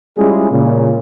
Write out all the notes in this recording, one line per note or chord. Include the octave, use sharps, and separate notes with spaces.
G3 G#3 C#4 E4 F4 G#4
A#2 C#3